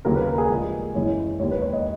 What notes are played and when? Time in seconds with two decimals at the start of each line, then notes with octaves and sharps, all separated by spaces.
0.05 D#2 C#3 F#3 A#3 A#4
0.16 B4
0.27 A#4
0.38 G#4
0.50 A#1 A#2 G#3
0.94 F#1 F#2 E3 G#3 C#5
1.40 E1 D#2 D#3 A#3 C#5
1.51 B4
1.62 C#5
1.73 D#5